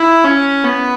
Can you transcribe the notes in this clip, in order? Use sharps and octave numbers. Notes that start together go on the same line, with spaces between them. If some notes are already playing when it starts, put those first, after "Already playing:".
Already playing: E4
C#4
B3